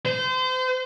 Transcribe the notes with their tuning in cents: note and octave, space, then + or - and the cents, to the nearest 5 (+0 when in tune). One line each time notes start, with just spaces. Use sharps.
C5 -30